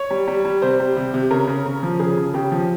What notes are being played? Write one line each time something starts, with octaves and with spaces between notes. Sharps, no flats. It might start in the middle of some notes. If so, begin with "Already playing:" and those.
Already playing: C#5
G3
G3
G3
C3 C5
G3
C3
C3
C#3 A#4
C#3
C#3
F3
C#3 G#4
C#3
C#3 G4
F3